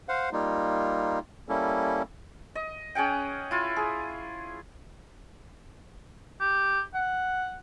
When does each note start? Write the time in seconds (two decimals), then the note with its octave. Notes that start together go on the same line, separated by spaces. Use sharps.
0.09 C5 F5 F#5
0.33 G3 A#3 D#4 F4
1.49 G3 A#3 C#4 E4 A4
2.55 D#5
2.95 C#4 G#4 F#5 G5
3.51 E4 F4
3.76 G#4
6.40 G4
6.95 F#5